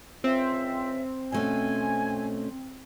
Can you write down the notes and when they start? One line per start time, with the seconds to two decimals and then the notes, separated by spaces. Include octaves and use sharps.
0.24 C#2 C4 F4 E5
1.32 B2 A3 C#4 G#5